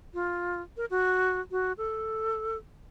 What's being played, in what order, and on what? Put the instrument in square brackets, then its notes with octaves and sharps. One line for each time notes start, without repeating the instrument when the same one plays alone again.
[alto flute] F4
A#4
F#4
F#4
A4